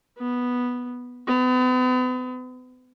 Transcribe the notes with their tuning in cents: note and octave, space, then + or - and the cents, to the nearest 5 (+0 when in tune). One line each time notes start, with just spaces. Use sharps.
B3 -5
B3 +40